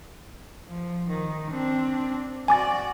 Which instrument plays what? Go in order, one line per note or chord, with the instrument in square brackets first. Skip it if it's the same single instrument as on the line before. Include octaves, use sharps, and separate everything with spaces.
[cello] F3
D#3
C4 D4
[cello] F#4 D5 [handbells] G#5 D6 A6